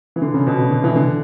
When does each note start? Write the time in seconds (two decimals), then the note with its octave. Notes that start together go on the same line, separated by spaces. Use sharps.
0.16 E3
0.22 D3
0.34 C#3
0.47 B2
0.59 C#3
0.71 D3
0.84 E3
0.96 D3